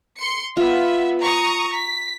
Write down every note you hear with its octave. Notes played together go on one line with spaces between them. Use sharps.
C6 C#7
B3 F4 E5
A#5 C#6 D#6
B6